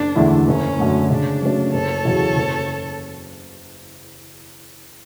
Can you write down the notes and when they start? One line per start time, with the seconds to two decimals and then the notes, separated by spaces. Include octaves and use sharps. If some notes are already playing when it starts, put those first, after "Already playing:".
Already playing: F#1 D4
0.15 E2 D3 A3 E4
0.47 F#1 C#4
0.79 F#2 D3 A3
1.10 C#3 D4
1.42 F#3 A3 C#4
1.73 F#1 A4 C#5
2.05 E2 C#3 F#3
2.36 F#1